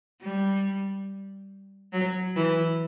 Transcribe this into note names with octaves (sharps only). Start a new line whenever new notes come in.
G3
F#3
E3